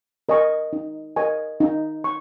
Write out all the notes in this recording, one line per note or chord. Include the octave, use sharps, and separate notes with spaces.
A#4 D#5 G#5 C#6
D#4
A#4 D#5 G#5 C#6
D#4
C#6